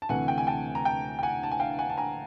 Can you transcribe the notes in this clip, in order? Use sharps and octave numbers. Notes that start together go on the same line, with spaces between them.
A5
D2 C3 E3 A3 F#5 G#5
G5
G#5
G5 A5
A#5
G5 A5
G5
F#5 G#5
A5
G#5
F5 G5
F#5 G#5
A5
G#5 A#5